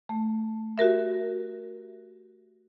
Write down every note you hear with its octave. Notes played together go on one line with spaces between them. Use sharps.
A3
F#4 G4 A#4 E5